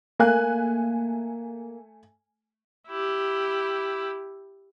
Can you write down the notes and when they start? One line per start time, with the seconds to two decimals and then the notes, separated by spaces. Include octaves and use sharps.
0.19 A3 A#3 G#5 F#6
2.88 E4 G4